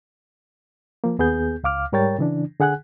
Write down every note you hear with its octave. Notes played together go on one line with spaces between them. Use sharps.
F3 A#3
D#2 B3 G#4 G6
C#2 F5 D6 F6
G#2 G3 A#4 C#5 G5 A6
C#3 E3 D4
D3 G#4 F#5 G#5 F#6